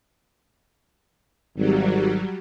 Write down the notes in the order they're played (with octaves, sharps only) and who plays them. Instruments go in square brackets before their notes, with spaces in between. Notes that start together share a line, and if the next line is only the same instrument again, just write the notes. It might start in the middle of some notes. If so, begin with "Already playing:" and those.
[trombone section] G#1 [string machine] F#3 G3